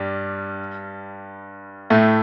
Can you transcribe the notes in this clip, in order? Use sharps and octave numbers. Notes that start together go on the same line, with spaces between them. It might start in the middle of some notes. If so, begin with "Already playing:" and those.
Already playing: G2 G3
A2 A3